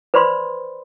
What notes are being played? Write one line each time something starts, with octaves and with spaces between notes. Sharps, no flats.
B4 C5 D5 B5 C6